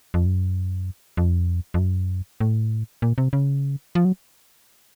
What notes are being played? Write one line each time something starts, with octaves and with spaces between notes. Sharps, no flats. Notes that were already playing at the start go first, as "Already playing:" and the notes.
F2
F#2
F2
F2
F#2
A2
A#2
C3
C#3
F3
F#3